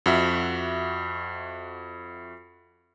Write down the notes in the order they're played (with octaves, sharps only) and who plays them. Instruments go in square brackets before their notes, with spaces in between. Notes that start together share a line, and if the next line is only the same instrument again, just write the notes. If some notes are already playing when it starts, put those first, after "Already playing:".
[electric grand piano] F2 F#4 E5